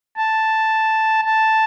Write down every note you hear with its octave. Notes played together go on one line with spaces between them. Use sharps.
A5
A5